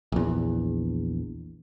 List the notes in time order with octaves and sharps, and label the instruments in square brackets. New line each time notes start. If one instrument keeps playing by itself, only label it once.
[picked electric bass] A#1 E2